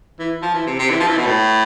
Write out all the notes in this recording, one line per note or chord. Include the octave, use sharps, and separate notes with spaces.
E3
F3
E3
C3
C3
E3
F3
E3
B2
A2